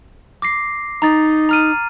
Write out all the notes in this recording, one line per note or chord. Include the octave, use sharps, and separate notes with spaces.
D6 A#6 C7
D#4 A#5 A6
A#5 F6 D#7